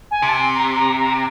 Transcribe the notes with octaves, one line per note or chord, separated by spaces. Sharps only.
G#5
C3
A5
G#5
A#5
A#5
A#5